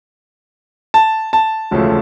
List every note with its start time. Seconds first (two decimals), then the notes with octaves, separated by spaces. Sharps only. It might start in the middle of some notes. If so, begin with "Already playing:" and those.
0.94 A5
1.33 A5
1.71 E1 D2 C#3 F3 A3